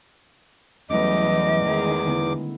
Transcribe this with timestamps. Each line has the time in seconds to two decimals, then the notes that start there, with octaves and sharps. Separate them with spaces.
0.90 E2 E3 F#3 G3 A3 C#4 D#5 D6
1.65 D#3 G#3 G#4
2.08 D3 B3 E4